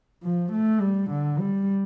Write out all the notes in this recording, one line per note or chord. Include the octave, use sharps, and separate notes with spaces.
F3
A3
G3
D3
G3